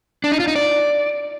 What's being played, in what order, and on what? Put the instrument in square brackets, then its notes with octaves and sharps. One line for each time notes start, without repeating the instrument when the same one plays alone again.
[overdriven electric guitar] D4
D#4
F4
D#4
D5